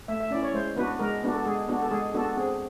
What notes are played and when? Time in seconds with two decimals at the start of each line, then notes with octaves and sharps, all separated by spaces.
0.08 A3 E5
0.20 E5
0.31 C#4 E4 D5
0.43 C#5
0.54 G#3 C5
0.76 B3 D4 F#4 B4
0.99 G#3 A#4
1.23 B3 D4 F#4
1.34 A4
1.46 G#3 G#4
1.68 B3 D4 F#4
1.82 A4
1.91 G#3 G#4
2.14 B3 D4 F#4 A4
2.37 C4 G#4